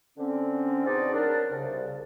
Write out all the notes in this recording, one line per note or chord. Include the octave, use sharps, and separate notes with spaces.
D3 C4 C#4
B2 C4 D4 D#4 G#4 D5
F#3 D4 A#4
C2 C#3